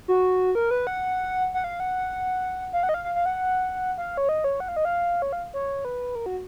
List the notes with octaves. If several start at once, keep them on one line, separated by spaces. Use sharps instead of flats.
F#4
A#4
B4
F#5
F#5
F5
F#5
F5
F#5
D#5
F5
F5
F5
F#5
F5
C#5
D#5
C#5
F#5
F5
D#5
F5
C#5
F5
C#5
B4
A#4
F#4